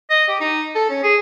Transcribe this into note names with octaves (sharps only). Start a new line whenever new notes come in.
D#5
G4
D#4
A4
C#4
G#4